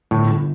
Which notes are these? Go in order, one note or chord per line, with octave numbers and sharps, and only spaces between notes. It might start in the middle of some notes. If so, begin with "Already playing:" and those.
G1 A2